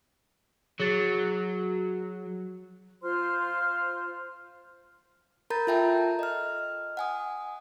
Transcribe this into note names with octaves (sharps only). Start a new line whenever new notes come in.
F#3 G#4 A6
F4 C5 C6 F6
A#4 A#5 B5 G6 A6
F4 A4 E5 G5 A5 A#5
D#5 F6
F#5 G#5 D#6